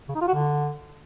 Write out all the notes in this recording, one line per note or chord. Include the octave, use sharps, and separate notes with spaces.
C#3
D#4
F4
F#4
D3